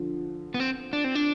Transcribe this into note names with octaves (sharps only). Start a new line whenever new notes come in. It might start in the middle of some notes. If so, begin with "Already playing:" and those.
Already playing: D3 F3
B3
C4
D4
C4
D4